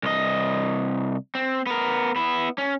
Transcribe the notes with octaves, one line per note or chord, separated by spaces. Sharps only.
C2 D#5
C4
B3 A#4
B3 E4
C#4